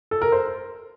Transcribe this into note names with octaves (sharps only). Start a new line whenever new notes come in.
A4
A#4
C5